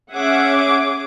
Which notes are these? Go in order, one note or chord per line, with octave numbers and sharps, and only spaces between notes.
C#4 G#4 E5 F#5 D6